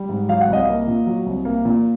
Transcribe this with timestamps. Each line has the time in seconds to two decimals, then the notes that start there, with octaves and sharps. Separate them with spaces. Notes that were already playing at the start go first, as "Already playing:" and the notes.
Already playing: G3
0.09 G#2
0.29 F#3 F5
0.41 F#5
0.48 C2
0.53 D#5 F5
0.69 A#3
0.88 A#2
1.07 F#3
1.26 C2
1.45 A#3
1.65 A#2